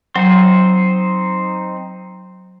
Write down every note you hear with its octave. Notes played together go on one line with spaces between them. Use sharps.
F#3 C4 D#4 C5